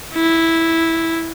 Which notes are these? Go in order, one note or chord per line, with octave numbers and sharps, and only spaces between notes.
E4